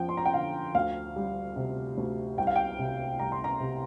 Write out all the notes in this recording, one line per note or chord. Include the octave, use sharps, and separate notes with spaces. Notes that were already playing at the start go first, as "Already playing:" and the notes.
Already playing: F2 F3 G5
C6
A#5
G5
D3 F5
D2 F5
G3
C3
D2
C2 G5
F5
G5
C3
C2 A#5
C6
A#5
C3